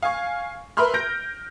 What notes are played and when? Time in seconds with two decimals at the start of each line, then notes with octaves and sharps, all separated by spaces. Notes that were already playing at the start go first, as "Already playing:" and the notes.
0.02 F5 G#5 C#6
0.77 A#4 B4 E5 B5 C6 F6
0.94 G6 A#6 D7